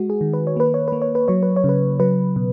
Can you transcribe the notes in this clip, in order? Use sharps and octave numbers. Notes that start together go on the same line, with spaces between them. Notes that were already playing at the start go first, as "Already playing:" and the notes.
Already playing: G#3 F#4
G#4
D#3
B4
C#5
A#3 B4
C#5
A#3 B4
C#5
B4
F#3 C#5
B4
C#5
C#3 B4
F#3 B4
B2